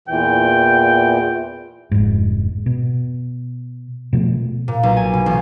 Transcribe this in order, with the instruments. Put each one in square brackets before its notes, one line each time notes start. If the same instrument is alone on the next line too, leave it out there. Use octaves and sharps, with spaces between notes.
[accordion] E2 A#2 E3 [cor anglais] G5
[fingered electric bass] F1 G#2
B2
B2 F3 A3
[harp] A#2
B1
G#5
B2
A1